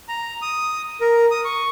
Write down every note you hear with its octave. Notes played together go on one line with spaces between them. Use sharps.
A#5
D#6
A#4
D#6
C#6